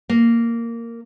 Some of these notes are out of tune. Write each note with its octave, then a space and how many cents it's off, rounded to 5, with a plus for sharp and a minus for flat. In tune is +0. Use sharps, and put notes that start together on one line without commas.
A#3 -10